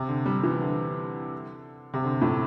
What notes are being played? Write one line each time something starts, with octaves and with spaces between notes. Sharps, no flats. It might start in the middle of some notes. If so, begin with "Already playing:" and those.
Already playing: C3
D3
G3
E3
D3
C3
D3
A2